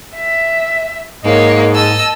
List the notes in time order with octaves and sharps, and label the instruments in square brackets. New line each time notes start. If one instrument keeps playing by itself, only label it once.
[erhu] E5
[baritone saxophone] G#2 [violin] A#3 C#5 [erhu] D#5
[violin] D#5 E6 [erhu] A5